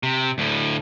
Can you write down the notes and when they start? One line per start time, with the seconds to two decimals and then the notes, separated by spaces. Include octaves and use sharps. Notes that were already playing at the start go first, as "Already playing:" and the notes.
0.03 C3
0.38 D2 A2